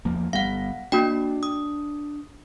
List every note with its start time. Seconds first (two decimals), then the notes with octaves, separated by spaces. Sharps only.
0.05 E2 F3 A#3
0.33 G1 G3 B3 F5 F#5
0.92 A#3 D4 F#4 G5
1.43 D#6